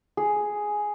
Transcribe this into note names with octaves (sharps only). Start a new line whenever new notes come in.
G#4